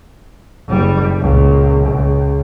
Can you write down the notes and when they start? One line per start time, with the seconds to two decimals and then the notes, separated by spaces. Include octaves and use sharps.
0.67 F#1 G3
1.20 C#2 A#2
1.87 C#2